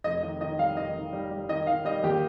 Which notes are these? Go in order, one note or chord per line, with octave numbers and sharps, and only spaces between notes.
F1 D#5
D#3 D#5
D#3 D#5
G3 F5
D#3 D#5
D#3
G3
G3
D#3 D#5
D#3 F5
G3 D#5
D#2 G4